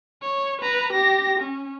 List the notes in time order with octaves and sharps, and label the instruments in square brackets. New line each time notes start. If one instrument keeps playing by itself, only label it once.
[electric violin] C#5
B4 A#5
G4 A#6
C#4